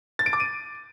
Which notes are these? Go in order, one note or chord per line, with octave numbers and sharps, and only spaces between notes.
A6
D7
D6
D#7